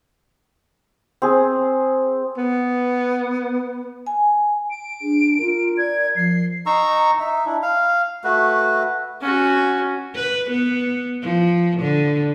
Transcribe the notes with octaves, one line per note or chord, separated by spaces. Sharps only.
C4 G#4
B3
G#5
D7
D4 G#4
F4 A#4
D5 G#6
F3 C7
D#4 A#5 C#6 E6
D#4 E5
D4 E4
F5
A3 F#4 B4
C#4 F#4
B4
B3
F3
D3